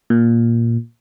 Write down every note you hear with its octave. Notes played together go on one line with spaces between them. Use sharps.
A#2